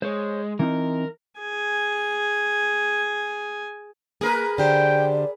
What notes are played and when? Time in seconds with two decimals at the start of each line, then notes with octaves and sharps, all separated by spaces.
0.02 G#3 C5 C#5
0.59 E3 C4 D#4 A#4
1.39 G#4 G#5
4.21 A#3 G#4 A#4 B4
4.58 D3 G4 C5 D5 G5